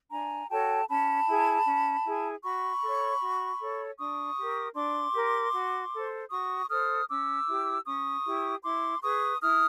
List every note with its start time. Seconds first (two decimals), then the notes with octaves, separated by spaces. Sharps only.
0.11 D4 G#5 A#5
0.50 F#4 A4 C#5 G5 A5
0.89 C#4 A5 B5
1.27 E4 G#4
1.66 C#4
2.05 E4 G#4
2.43 F#4 B5 C#6
2.83 A4 C#5
3.21 F#4
3.60 A4 C#5
3.99 D4 C#6 D#6
4.38 G4 A#4
4.76 D4 C6 D6
5.15 G4 A#4
5.54 F#4
5.93 A4 C5
6.31 F#4 C#6 D#6
6.70 A4 C5 D#6 F6
7.08 C#4 D6 E6
7.47 E4 G4
7.86 C#4 C#6 D#6
8.25 E4 G4
8.63 E4 C6 D6
9.02 G#4 B4 C#6 D#6
9.41 E4 D#6 F6